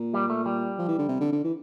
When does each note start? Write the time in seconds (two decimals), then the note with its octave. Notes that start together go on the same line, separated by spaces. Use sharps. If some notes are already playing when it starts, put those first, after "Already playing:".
Already playing: A#2
0.14 G3
0.30 A3
0.46 G3
0.79 F3
0.88 E3
0.99 D3
1.08 C3
1.20 D3
1.32 D3
1.44 E3